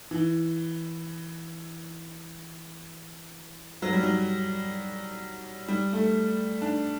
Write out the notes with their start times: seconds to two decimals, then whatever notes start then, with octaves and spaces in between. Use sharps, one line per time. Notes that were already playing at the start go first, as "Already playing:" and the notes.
0.11 E3
3.82 F#3
3.93 G3
4.03 F#3
5.68 G3
5.93 A3
6.62 D4